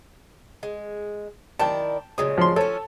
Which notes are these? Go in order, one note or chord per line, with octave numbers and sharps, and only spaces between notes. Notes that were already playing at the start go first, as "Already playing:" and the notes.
G#3
D#3 E4 D5 G5 A5
A#2 C#3 G#3 D#6
F3 C6
F3 C#4 A4 C#5